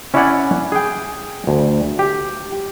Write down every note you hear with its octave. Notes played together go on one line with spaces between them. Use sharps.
C#4 E4 C#5 D5 F#5 G#5
G#4 G5
D2
G4